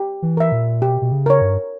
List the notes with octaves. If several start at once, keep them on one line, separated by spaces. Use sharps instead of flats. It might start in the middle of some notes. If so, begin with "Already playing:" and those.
Already playing: G4
E3
A#4 E5
A#2
B2 G4
B2
C#3
A#4 C#5
G2